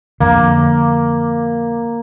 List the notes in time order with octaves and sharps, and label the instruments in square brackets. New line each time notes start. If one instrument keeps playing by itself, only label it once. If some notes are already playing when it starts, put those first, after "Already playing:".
[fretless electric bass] F2 D3 [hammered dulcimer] A#3